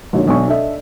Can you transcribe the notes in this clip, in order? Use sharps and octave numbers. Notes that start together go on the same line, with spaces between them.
A#1 D3 D#3 F#4 C#5
B1 B2 D4 C#6
D4 A4 D#5 E5